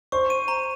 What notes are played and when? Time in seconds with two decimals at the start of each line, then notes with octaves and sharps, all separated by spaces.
0.12 C5 C#6
0.30 D#7
0.48 A#5